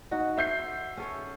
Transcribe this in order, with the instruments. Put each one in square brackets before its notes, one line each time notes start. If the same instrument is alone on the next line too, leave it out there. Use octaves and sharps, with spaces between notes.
[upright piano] D#4 [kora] F#4
[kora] C5 [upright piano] E5 G6 C7
[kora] C#4 A4 C#5